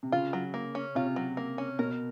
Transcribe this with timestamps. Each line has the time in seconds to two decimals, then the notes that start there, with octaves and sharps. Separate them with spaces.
0.03 C3
0.12 C#3 F4
0.33 F#3
0.54 A#3
0.75 C#4
0.95 C3 F4
1.16 F#3
1.37 A#3
1.58 C#4
1.79 B2 A#4